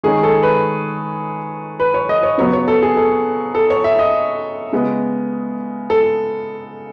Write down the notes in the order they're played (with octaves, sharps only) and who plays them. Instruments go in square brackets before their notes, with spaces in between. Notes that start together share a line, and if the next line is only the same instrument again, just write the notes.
[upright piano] D#3 G#3 C#4 G#4
A4
B4
B4
C#5
D#5
C#5
C#3 F#3 B3 C#5
C#5
A4
G#4
A4
A4
C#5
E5
D#5
C#3 G#3 B3
A4